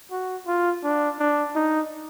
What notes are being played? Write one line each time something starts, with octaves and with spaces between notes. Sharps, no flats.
F#4
F4
D4
D4
D#4